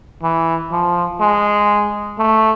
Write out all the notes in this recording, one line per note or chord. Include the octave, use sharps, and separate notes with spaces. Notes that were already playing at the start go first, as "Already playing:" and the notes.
E3
F3
G#3
A3